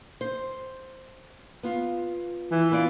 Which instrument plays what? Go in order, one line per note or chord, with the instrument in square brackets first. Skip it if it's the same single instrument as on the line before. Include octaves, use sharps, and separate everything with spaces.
[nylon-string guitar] C5
B3 F4
[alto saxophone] E3
[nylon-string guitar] B3 F4 D5